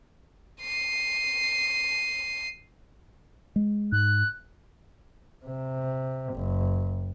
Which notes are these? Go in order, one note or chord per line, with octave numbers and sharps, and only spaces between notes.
C7 D#7
G#3
G#2 F#6
C3
F#1